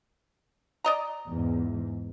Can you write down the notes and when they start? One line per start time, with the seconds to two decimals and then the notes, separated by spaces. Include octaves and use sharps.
0.84 D5 D#5 A#5
1.27 E2 G#2